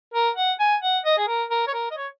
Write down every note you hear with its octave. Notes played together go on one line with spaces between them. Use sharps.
A#4
F#5
G#5
F#5
D#5
G#4
A#4
A#4
C#5
A#4
D#5
C#5